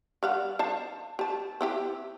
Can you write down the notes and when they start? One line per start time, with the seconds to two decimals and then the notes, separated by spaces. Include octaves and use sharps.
0.23 G3 F5 F#5
0.59 C5 F5 A5
1.19 G4 A5
1.61 C4 E4 G4